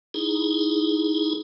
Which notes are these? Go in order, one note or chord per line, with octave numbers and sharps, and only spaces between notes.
D#4 E4 G#4